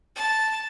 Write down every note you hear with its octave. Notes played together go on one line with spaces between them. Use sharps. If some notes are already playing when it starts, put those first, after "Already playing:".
A5